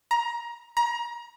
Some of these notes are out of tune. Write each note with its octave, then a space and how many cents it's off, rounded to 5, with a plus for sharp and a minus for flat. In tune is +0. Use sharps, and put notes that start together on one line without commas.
A#5 +20
A#5 +30